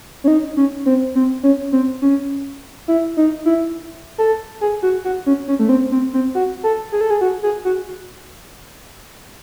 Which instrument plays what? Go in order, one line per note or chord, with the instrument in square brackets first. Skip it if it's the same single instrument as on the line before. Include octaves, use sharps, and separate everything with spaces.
[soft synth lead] C#4
D#4
C#4
C4
C4
C#4
C4
C#4
E4
D#4
E4
A4
G#4
F#4
F#4
C#4
C#4
A3
C4
C4
C4
F#4
A4
G#4
A4
G#4
F#4
G#4
F#4